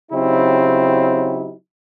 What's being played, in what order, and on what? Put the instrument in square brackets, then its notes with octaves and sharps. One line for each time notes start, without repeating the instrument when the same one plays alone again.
[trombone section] C#3 F#3 C4 D#4 E4 G4